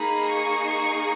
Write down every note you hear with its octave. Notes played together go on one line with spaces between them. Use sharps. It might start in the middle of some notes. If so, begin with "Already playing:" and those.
Already playing: A#3 D#4 G#4 B5
C#6
C#6